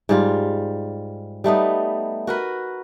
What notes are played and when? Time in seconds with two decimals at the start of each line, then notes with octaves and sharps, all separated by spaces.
0.09 G#2 G3 F4
1.44 G3 A3 B3 D#4
2.27 F#4 A#4 B4